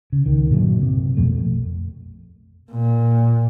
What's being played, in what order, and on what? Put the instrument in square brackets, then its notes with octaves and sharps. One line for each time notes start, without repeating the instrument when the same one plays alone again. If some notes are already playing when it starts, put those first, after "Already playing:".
[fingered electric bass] C#3
C2 D#3
G2 A#2 D3 F#3
C3
A#1 F2 B2 A3
[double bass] A#2